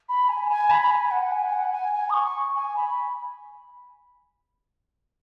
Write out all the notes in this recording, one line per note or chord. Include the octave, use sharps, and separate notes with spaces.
B5
G#5
G#5
B5
B5
G#5
F#5
G#5
F#5
G#5
G#5
D#6
C#6
G#5
B5